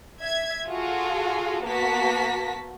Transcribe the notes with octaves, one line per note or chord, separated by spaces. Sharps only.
E5 G#6
F4 F#4 G#4 A4
A#3 B3 F#4 A5 B6